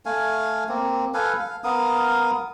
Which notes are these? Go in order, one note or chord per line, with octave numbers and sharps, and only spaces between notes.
A3 F5 G#5
A#3 C4
A4 B4 F5 G#5
F5
B3 A#4 F5 D#6